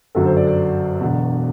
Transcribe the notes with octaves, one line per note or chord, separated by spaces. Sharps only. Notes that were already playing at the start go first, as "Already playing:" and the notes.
G1 F#2 F#3 A4
C5
D5
D5
E1 E2 B2